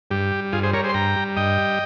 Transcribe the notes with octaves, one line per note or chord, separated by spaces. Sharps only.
G2 G4
G3
G2 F4 G#4
G#4 C5
G3 A#4 C#5
G#4 C5
C6
G2 G5 A#5
G3
G2 D#5 G5
G3